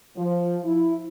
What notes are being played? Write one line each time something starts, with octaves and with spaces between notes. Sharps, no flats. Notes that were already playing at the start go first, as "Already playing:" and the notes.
F3
E4